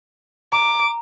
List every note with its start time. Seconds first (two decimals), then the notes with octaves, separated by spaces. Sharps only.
0.52 A#5 D6